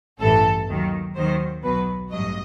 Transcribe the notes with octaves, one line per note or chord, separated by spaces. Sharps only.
A1 G2 E3 A4
D#2 D#3 F#3
D#2 D#3 F#3 C5
B1 B2 F#3 B4
A1 G2 F#3 D#5